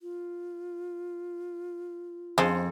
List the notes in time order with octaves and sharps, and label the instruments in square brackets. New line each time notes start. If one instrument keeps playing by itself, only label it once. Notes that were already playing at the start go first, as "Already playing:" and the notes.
[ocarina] F4
[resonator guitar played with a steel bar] F2 [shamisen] C#3 G#3 C5